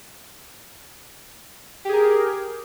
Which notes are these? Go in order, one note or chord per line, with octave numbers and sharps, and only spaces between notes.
G4 G#4 A#4